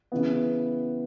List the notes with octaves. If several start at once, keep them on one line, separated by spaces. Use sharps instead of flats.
C#3 E3 B3